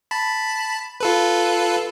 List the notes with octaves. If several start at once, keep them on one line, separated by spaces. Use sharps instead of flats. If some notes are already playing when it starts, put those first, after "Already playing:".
A5 B5
F4 A4 B4